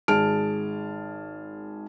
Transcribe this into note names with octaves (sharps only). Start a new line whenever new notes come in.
G#1 G#4 A5 F6 D7